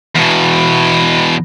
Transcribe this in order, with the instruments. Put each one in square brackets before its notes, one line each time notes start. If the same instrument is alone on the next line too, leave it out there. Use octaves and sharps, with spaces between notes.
[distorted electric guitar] E2 B2